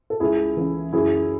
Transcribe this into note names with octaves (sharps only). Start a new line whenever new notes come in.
A4
C#2 E4 G#4
C#3 E3
F#2 E4 G#4